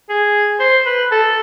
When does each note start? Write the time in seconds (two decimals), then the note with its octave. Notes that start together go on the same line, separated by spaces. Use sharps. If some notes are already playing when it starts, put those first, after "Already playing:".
0.09 G#4
0.60 C5
0.86 B4
1.11 A4